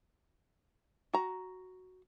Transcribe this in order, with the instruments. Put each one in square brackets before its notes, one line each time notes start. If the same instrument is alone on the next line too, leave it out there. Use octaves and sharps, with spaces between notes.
[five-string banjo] F#4 A#5